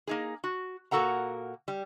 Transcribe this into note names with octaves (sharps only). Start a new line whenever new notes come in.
A#3 D#4 G#4
F#4
A#2 A#3 F#4 A4 F#5 A#5
G3